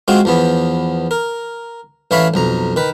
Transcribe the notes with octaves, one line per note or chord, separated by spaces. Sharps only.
G#3 C4 F4 F#4
E2 F3 B3
A#4
A1 E3 E4 C#5 F5 B5
B1 F2 A#5
D#3 B4